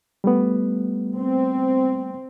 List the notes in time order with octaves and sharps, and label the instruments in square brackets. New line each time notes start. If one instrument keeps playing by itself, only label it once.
[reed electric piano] G3 A3 B3
[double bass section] C4